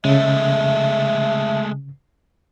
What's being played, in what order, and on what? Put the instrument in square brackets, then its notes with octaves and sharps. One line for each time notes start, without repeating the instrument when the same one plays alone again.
[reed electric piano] C#3 [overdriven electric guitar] G#3 A3 [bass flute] E5